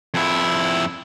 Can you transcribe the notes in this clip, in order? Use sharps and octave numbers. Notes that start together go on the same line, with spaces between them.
F2 E4